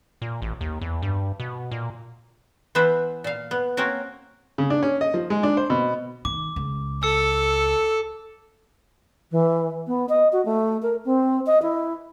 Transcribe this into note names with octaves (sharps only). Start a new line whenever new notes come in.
A#2
A1
D#2
E2
G2
B2
A#2
E3 B3 B4 C5 E5
A#2 F5
B3
A#3 C4 C#4 F#4 A#4
C#3
D4
C#4
D#5
F3
G#3
D4
C5
B2
D#3 D6
C#2
A4 E6 C#7
E3
B3
D#5
F#4
A3
A#4
C4
D#5
E4